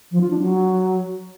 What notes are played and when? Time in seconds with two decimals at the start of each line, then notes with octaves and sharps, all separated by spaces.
0.12 F3
0.21 F4
0.30 D4
0.40 F#3